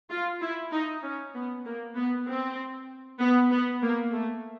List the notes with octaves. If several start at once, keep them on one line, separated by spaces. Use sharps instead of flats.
F4
E4
D#4
C#4
B3
A#3
B3
C4
B3
B3
A#3
A3